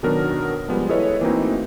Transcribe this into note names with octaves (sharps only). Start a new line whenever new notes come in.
B2 D#3 F#3 B3 D4 A#4
F3 G3 G#3 B3
E4 G#4 A4 B4 C#5 D#5
E3 A3 A#3 C4 D#4 F#4